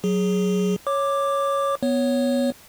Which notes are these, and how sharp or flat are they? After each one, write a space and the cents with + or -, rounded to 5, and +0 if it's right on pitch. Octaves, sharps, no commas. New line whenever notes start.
F#3 +0 G#4 +0
C#5 +0 D6 +5
B3 +0 C#5 +0